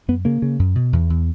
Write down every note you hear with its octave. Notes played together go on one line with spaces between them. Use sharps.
F#2 B3
C#3 A#3
C#3
F#2
B2
E2
E2